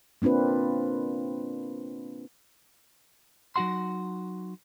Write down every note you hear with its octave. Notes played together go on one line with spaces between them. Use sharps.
A#3 C4 D4 F4 B4
F#3 D#4 F#4 F#5 C6